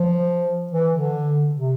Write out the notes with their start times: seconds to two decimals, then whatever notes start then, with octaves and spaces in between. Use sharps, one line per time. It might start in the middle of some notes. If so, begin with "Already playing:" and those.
Already playing: F3
0.73 E3
0.94 D3
1.55 C3